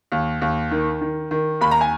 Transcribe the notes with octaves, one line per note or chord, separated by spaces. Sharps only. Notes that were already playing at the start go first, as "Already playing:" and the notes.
D#2
D#2
D#3
D#3
D#3
D#2 B5
A#5
G#5